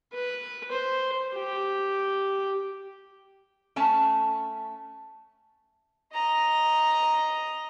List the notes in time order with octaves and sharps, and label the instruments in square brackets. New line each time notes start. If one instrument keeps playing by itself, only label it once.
[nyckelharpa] B4
C5
G4
[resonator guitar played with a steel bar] A3 C#4 A5
[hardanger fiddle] D#5 A#5